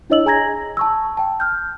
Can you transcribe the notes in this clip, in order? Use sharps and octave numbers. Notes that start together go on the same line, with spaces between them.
D4 E4 C#5 D#5 E6 F#7
G#4 G#5 A#5 G#6 A#6
A5 C#6 E6
G5 A5
F6 G6